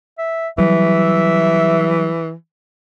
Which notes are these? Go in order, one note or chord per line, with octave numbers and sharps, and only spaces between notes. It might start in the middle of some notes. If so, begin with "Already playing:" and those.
E5
E3 F#3 G3 E5